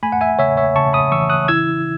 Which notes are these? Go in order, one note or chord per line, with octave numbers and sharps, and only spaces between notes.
A3 G#5 B5
F#5
E5 G#5
C#3 C#5 E5
C#5 E5
C#3 A5 C#6
B5 D#6
E3 C#6 E6
D#6 F#6
E4 E6 G#6